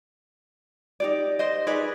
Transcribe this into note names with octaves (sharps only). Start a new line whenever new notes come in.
D#4 G4 D5
C5 D#5
D#4 G#4 B4 D5